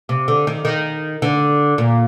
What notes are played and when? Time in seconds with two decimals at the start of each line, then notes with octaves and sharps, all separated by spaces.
0.09 C3
0.28 D3
0.47 D#3
0.65 D#3
1.22 D3
1.78 A#2